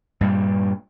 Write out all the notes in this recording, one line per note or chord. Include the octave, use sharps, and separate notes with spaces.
G2 A#2 G3